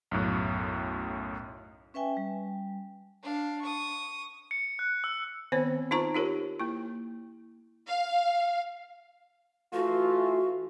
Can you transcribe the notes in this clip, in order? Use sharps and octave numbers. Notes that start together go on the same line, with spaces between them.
B1 F#2 A2
C#4 B4 E5 G5 G#5
G3
D4 F5
C#6 D#6
C#7
F#6
E6
D#3 B3 C4 C5 C#5
D#4 F4 C5 A5 A#5 C#6
D#4 F4 G4 A#4 C#5
A#3 E4
F5
E3 A3 F4 F#4